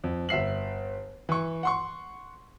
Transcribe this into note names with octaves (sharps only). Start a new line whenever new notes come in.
F2
G1 E5 C7 F#7
E3 C#6
F#5 C6 C#6